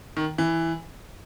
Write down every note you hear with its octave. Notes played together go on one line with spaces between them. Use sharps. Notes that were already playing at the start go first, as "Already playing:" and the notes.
D#3
E3